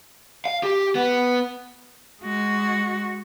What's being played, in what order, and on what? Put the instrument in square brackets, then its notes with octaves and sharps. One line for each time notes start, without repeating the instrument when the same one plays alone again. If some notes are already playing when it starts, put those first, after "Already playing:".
[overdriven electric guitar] F5
G4
B3
[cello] G#3 F#4